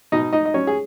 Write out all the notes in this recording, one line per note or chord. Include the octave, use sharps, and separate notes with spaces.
B2 D#4 D#5
D#4 D#5
D#5
F#3 C#4 C#5
G#4